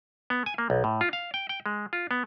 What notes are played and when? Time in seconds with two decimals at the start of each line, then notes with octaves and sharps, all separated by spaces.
0.30 B3
0.46 G#5
0.58 A#3
0.70 B1
0.84 A2
1.01 F4
1.13 F5
1.34 G5
1.49 G5
1.66 G#3
1.93 F4
2.11 B3